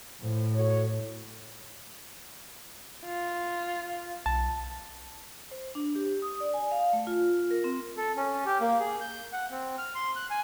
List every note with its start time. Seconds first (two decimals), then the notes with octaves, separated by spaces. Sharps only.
0.21 A2 F3
0.54 F#4 A4 C#5
3.05 F4
4.26 B1 A5
5.51 C5
5.75 D4
5.95 G4
6.22 D#6
6.40 D5
6.54 G#5
6.72 F5
6.93 A3
7.07 F4
7.51 A#4
7.64 C4
7.97 A4
8.17 C#4
8.46 G4
8.61 A#3
8.79 G#4
9.01 G6
9.32 F#5
9.50 C4
9.78 F6
9.95 C6
10.16 F#6
10.30 G#5